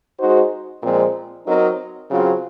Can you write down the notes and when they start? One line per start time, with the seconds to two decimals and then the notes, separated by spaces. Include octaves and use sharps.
0.19 G#3 D#4 F#4 C5
0.83 A#2 F3 G#3 C4
1.46 F#3 C4 D#4 A#4 D#5
2.10 C#3 F#3 C4 F4